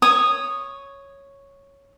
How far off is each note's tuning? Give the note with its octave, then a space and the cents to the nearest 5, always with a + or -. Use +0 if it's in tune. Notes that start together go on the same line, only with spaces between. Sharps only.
C#5 +0 D#6 -10